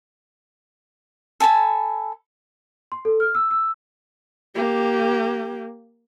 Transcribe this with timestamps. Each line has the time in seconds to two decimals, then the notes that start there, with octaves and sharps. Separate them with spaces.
1.40 A4 G#5 A5 B5
2.92 C6
3.05 A4
3.20 F6
3.35 E6
3.51 E6
4.56 A#3 G4